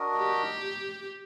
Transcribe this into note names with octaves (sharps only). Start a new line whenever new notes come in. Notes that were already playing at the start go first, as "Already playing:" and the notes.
Already playing: D4 F#4 A#4 D#5
G4